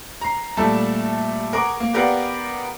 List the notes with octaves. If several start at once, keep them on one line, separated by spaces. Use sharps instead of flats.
A#5 C7
A#2 G3 A3 A4 E5 A5
G#4 A#4 F#5 A#5 C#6 D6
A#3
B3 G4 A#4 D5 F5 F#5